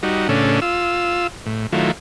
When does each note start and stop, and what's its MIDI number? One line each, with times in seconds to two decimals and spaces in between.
0.03 0.28 55
0.03 0.28 63
0.03 0.28 66
0.29 0.60 45
0.29 0.60 49
0.29 0.60 61
0.29 0.60 62
0.29 0.60 69
0.62 1.27 65
0.62 1.27 88
1.46 1.67 45
1.73 1.91 51
1.73 1.91 54
1.73 1.91 57
1.73 1.91 64
1.73 1.91 65